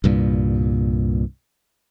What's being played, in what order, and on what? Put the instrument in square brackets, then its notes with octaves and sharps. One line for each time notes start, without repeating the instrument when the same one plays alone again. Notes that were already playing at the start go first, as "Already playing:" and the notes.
[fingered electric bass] C2 G2 A#2